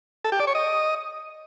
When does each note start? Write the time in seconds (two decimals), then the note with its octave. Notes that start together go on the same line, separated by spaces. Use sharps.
0.25 A4
0.32 G4
0.40 D5
0.47 C#5
0.55 D#5